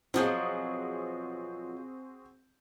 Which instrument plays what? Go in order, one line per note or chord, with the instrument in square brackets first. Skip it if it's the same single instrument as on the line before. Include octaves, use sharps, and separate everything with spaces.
[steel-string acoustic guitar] B2 F3 F#3 [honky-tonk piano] C4 F#4 G#4